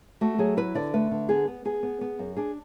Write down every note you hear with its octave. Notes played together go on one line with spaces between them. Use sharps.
A3 F#4
F#3 G#4
E4 B4
D3 D5
A3 B4
D3
B3 G#4
B3
B3 G#4
B3
B3
F#2
D4 G#4